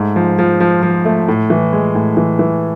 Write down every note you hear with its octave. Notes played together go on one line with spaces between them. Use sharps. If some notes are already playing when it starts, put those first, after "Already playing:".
Already playing: G#2 A3
F3
F3
F3
F3
A3
A2
E3
G#3
A2
E3
E3